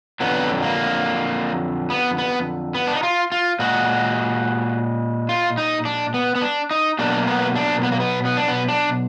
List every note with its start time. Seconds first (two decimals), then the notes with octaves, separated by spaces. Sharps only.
0.20 F2 D3 F#3 B3
0.63 A#3
1.90 B3
2.18 B3
2.74 B3
2.87 D4
2.95 D#4
3.03 F4
3.32 F4
3.59 A#2 G#3 F#4
5.29 F4
5.58 D#4
5.85 D4
6.14 B3
6.35 B3
6.42 D4
6.71 D#4
6.99 B2 F#3 A#3 D4
7.27 B3
7.55 D4
7.83 B3
7.92 A#3
8.00 B3
8.25 B3
8.37 D4
8.48 B3
8.68 D4